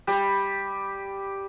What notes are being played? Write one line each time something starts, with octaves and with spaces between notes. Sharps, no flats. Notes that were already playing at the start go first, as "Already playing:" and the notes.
G3